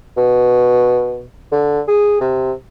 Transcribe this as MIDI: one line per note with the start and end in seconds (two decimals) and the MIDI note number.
0.17 1.24 47
1.52 1.80 50
1.88 2.19 68
2.21 2.52 48